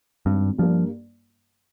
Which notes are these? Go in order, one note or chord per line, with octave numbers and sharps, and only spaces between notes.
G#1 G2
G2 F3 G3 A#3